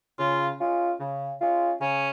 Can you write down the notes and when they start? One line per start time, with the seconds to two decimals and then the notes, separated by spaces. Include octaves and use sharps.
0.19 C#3 F4
0.60 G#3 C#4 F4
1.00 C#3
1.40 G#3 C#4 F4
1.81 C#3 C#4